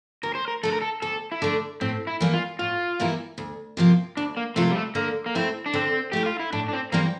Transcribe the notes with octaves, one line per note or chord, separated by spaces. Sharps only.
D2 A#4
C5
A#4
D3 A3 A4
A#4
A4
D2 A4
E4
D3 A3 D4
A2 C4
E4
E3 G3 A#3 E4
F4
A2 F4
E3 G3 A#3 E4
D2
C3 F3 A#3 F4
D2 D4
A#3
C3 F3 A3 A#3 F4
G3
A3
D3 A#3
A#3
A3 C4 E4
D4
D3 C4
A3 E4 G4
F4
E4
A2 D4
D4
C4
E3 G3 A#3 C4